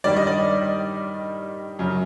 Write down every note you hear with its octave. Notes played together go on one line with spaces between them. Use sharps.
G2 D#3 G3 D5
D#5
D5
F#2 C#3 F#3